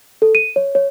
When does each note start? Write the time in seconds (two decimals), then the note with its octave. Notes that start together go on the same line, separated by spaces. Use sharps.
0.22 A4
0.35 D#7
0.56 C#5
0.75 C#5